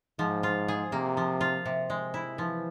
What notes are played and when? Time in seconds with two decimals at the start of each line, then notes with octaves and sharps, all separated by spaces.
0.19 G#2 F3
0.43 F4
0.68 G#4
0.92 C3 A#3
1.17 F3
1.41 F4
1.66 C3
1.90 G#3
2.14 E4
2.38 E3 F3